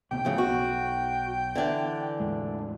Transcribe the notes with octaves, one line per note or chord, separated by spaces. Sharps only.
D2 C3 B3 G5
D2 A2 C#3 F3
B1 B3 F#4
D3 E3 D4
E2 A2 G#3